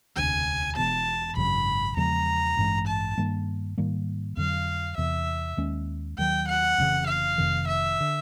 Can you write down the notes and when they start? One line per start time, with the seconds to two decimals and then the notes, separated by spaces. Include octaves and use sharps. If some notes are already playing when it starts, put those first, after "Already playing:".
0.16 E1 D2 C3 G#5
0.76 E1 E2 B2 A5
1.37 G#1 F#2 C#3 F#3 B5
1.97 E2 C#3 F3 G#3 A#5
2.57 A1 G2 E3 G#3
2.87 A5
3.18 G2 D#3 G3 A#3
3.78 G#2 D#3 G3 A#3
4.37 F2 D3 F#3 F5
4.98 E2 C3 E3 E5
5.57 D#2 D#3 G#3 C#4
6.18 D#2 D#3 F#3 G5
6.48 F#5
6.78 F1 F2 C#3 E3
7.08 F5
7.38 F1 F2 C3 D#3
7.69 E5
8.00 D3